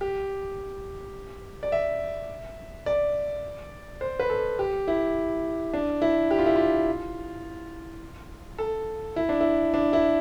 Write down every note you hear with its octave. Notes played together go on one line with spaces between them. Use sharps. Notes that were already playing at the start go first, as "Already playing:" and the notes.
G4
D5
E5
D5
C5
B4
A4
G4
E4
D4
E4
G4
F4
E4
F4
A4
E4
D4
E4
D4
E4